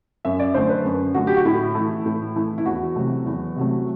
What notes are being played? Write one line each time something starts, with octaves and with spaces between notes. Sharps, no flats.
F#2 E5
D5
D3 A3 C5
B4
F#2
D3 A3 F#4
G4
F#4
A2 E4
E3 A3
A2
E3 A3
E4
E2 F#4
C3 F#3 A3
E2
C3 F#3 A3